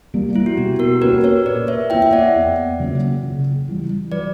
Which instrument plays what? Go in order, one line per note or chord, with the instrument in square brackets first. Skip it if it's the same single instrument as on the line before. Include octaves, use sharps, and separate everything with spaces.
[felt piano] G3 A#3
[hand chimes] E4
F#4
[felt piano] B2 [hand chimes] G4
[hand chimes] F#4 A#4
[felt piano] A#3 C#4 F#4 A#4 [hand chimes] G4 B4
[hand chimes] A#4 C#5
[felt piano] A#2 [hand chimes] B4 D5
[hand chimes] C#5 E5
[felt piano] E4 [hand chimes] E5 G5
[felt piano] A#3
[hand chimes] E5
D5 F#5
[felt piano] E2
C#3 F#3 A#3 C#4
C#3
E3 G3
[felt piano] F#3 [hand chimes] B4 D5